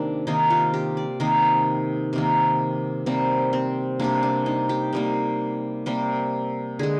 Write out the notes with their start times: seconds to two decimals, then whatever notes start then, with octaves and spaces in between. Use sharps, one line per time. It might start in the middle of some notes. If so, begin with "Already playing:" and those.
Already playing: C3 D#3 A#3 D4
0.27 C3 D#3 A#3 D#4
0.50 F4
0.74 G4
0.97 D5
1.20 C3 D#3 A#3 D#4
2.13 C3 D#3 A#3
3.06 C3 G3 A#3 C4
3.53 C4
4.00 C3 G3 A#3 D4
4.23 D4
4.46 D#4
4.69 G4
4.93 C3 G3 A#3
5.86 C3 G3 A#3
6.79 D3 G#3 G#4